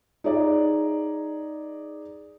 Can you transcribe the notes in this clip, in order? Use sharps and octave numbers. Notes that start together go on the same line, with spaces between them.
D#4 G#4 D5 D#5